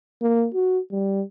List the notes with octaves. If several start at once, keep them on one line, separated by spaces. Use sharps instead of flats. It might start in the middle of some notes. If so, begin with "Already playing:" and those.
A#3
F#4
G3